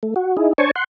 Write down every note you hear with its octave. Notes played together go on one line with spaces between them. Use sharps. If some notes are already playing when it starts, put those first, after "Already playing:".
A3
F#4
D#4 E4 G#4
D4 C5 C#5 G#5 A5 C#6
F#5 C6